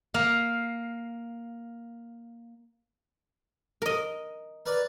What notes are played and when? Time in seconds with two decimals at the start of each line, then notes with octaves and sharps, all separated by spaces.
0.14 A#3 F5
3.82 A#4 D#5
4.66 A#4 B4 D5